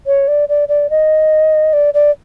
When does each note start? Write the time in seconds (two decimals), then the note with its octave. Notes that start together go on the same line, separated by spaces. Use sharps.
0.06 C#5
0.28 D5
0.49 D5
0.68 D5
0.90 D#5
1.73 D5
1.94 D5